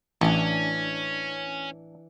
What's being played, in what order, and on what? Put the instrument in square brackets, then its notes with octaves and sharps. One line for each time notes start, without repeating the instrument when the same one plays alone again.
[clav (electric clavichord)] A1 [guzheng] E3 D4 [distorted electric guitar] C#4